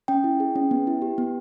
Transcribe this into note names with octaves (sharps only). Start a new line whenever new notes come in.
C#4 G5
E4
G#4
C#4
B3
E4
G4
B3